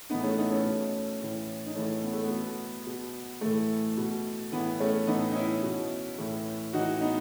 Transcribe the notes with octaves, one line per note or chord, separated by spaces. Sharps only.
A2 E3 B3 D#4
A3 C#4
B3 D#4
A3 C#4
B2
A2 E3
D#4
A2 E3 A3 C#4
B3
A3
B3
B2
B2
A2 E3 A3
B2
A2 E3 B3
A3 C#4
A2 E3 B3 D#4
D#4
C#4 E4
B2
A2 E3
A2 E3 D#4 F#4
B3 D#4